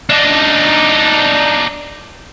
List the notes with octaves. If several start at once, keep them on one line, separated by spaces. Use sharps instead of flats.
D4 D#4